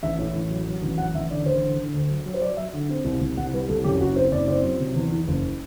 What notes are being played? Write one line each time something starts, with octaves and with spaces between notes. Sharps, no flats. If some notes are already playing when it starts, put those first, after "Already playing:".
A1 E5
A2
A1
F#3
F#3
A1
A1 F#5
A1 E5
D3 D5
A1 C5
D3
D3
D2
F#3
F#3
C5
F#3 D5
F#3 E5
D3
C4
C2
C2
C2 F#5
G3 B4
C2 A4
F#2 G4
F#1 F#4
C4 C5
F#1 D5
C4 D5
F#3
C3
E2
E3
F#1